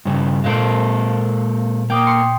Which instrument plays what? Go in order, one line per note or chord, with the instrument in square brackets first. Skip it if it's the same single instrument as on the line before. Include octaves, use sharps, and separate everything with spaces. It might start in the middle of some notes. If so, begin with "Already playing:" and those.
[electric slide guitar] G2 C#3
[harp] A#2 C5 D7 [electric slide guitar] G#3 A#3 A4
[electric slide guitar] A#3 [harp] G5 D6 D#6
[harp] C6 C#7